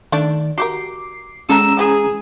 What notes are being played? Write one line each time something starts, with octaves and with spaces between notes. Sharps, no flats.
D#3 A3 D4 D5
F#4 G4 A#4 D6 C7
G#3 C#4 A4 A#5 E6
E3 G#4